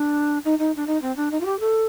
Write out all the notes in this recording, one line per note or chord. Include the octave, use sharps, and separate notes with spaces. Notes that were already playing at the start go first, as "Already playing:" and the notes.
Already playing: D4
D#4
D#4
D4
D#4
C4
D4
D#4
F4
G4
A4